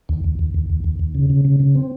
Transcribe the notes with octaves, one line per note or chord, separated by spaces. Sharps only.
D#2
D#2
D#2
D#2
D#2
D#2
D#2
C#3
C#3
C#3
C#3
C4